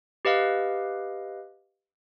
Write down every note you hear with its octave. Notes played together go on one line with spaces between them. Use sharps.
G4 B4 D#5 F5